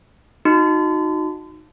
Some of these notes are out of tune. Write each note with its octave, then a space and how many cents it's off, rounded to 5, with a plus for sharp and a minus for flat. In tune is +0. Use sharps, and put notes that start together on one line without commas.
D#4 +0 F#4 -25 C6 -40